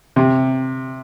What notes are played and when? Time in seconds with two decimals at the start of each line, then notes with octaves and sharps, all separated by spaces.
0.16 C3